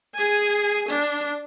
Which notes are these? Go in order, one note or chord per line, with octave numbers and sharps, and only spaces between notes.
G#4 G#5
D4